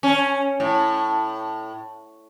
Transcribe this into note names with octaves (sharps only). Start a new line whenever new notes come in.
C#4
A2